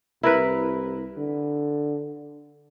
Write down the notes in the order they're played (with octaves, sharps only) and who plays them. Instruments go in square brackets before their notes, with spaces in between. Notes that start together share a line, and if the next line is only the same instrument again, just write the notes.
[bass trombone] C2 [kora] E4 A#4 B4
[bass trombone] D3